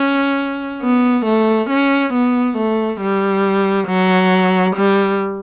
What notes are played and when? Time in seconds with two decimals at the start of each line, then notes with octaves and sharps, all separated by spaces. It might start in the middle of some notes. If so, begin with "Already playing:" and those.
Already playing: C#4
0.81 B3
1.25 A3
1.69 C#4
2.13 B3
2.57 A3
3.01 G3
3.88 F#3
4.75 G3